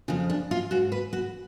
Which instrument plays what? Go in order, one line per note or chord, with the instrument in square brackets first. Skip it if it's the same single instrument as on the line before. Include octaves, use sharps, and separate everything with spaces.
[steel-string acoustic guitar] F2 C#3 F4
D4
F4
G#2 F#4
B4
F#4